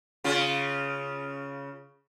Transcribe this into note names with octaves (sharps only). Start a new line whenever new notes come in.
C#3 F4